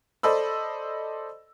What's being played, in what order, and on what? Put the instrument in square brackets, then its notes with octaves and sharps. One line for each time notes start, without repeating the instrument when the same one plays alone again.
[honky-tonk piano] A4 C5 D5 D#5 B5 E6